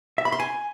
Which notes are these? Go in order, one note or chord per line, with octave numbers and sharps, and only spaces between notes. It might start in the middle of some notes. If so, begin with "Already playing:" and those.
E5
B5
C6
G#5